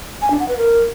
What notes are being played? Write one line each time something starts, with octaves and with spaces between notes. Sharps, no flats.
G#5
D4
F#5
B4
A#4